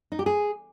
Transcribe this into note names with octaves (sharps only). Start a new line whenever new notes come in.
D#4
G4
G#4